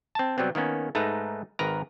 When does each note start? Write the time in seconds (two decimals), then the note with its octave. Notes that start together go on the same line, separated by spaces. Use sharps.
0.15 C4 A5
0.38 C3 F#3 G3 B3 C4
0.55 D#3 A#3 B3 C#4
0.95 G#2 A3 D#4 B4 A#5
1.59 G#1 D#3 A#4 B4 A#5